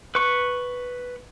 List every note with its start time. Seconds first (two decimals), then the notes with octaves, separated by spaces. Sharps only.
0.15 B4 C#6